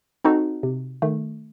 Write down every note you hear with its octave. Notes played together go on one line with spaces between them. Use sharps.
C4 D#4 F#4 A4
C3
D#3 A3